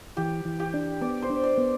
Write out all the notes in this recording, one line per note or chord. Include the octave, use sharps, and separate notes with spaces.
E3 G4
E3
G4
D4
B3 D5
C5
D4
D5
B3